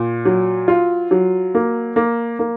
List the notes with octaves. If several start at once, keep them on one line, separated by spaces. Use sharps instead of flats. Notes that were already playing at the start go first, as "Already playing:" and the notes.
Already playing: A#2
F#3
F4
F#3
A#3
A#3
A#3